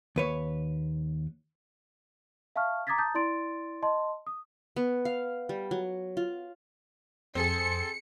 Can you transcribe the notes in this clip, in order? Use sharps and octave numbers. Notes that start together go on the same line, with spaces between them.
D#2 B4 C#5
E5 F5 A5 C#6 F6
A#5 D6 D#6 G#6 A6 B6
A5 A#5 D#6 G6 A6
E4 D5 C6 A6 D7
D#5 A5 C6
D#6
B3
F5
G3
F#3
F4
F2 C4 G#4 A4 C#7